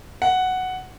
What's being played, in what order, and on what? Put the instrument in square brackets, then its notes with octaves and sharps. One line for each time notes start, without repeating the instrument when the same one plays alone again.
[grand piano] F#5